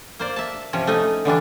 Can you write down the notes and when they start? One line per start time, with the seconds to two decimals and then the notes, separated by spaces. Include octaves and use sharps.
0.19 A#3 C5 D5
0.36 E5 A5
0.73 C3 F3 C#4
0.87 A3 C#4 D#4 D#5
1.25 D3 E3 G3 D4